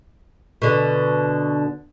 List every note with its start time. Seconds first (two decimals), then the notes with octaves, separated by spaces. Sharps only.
0.62 B2 D3